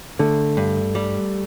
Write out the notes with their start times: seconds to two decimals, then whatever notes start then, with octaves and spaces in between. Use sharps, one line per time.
0.19 D3 A3
0.57 G2
0.95 G3